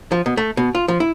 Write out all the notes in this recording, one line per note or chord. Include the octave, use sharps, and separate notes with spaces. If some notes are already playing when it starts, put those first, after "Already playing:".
F3
B2
A3
B2
F4
F3
E4